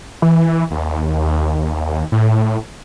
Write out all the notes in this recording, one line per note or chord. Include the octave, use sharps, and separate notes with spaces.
E3
D#2
A2